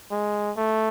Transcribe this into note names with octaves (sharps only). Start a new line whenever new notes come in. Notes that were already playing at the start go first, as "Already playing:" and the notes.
G#3
A3